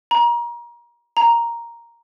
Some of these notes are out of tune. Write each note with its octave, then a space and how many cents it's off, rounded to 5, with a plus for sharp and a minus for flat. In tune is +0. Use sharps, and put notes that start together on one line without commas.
A#5 +30
A#5 +0